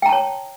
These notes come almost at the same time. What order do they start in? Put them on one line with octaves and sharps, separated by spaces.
G5 A#5 A5 C#5